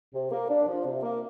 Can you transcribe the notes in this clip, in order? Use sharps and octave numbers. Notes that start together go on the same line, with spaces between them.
C3
A#3
D4
F3
C3
A#3